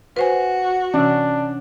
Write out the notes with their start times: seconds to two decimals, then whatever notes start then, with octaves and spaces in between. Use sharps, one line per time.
0.17 F#4 B4 C5 G#5
0.94 C3 E3 C#4 D4